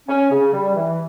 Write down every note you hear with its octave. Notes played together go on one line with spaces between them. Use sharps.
C#4
C#3
G3
E3